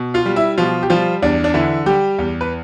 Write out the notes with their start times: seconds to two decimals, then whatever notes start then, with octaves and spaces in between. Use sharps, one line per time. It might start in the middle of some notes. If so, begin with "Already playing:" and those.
Already playing: B2
0.14 F4 F5
0.26 G3
0.36 E4 E5
0.58 B2 F3 F4
0.83 G4
0.90 F3 G3 F4
1.22 E2 D4
1.44 D4
1.54 D3 E3 E4
1.86 G3 G4
2.18 E2
2.41 B4